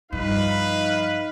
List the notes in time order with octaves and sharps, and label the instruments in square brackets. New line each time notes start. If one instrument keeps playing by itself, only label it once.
[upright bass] G2 F3 [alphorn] D#4 [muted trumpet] B4 [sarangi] F5